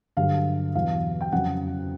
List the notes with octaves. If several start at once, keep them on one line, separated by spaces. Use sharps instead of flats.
G2 D3 F#3 F5
E2 B2 F#3 F5
G5
F2 C#3 F#3 F#5